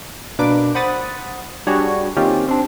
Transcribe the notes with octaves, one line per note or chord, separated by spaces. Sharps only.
B2 A#3 D4 B4 D6
C5 F#5 B5 D#6 A6
G3 D4 F#4 G#4 C#5
D#3 A#3 C4 C#4 F4 G4
C4 D4